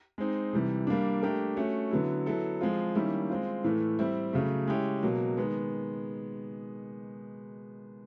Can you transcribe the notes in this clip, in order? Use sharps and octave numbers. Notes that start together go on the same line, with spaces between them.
G#3 C4 D#4
C3 E3 G3
G3 A#3 D4
A3 D4 G4 A#4
A3 C#4 F#4
D3 F#3 B3 E4
F#3 B3 E4 A4
F3 G#3 C4 F4
D#3 G3 A#3 C#4 E4
G#3 C4 F4
A2 E3 A3
G3 C4 E4
C#3 F#3 A3
G#3 C#4 E4 G4
B2 F#3 A#3
D#3 G#3 B3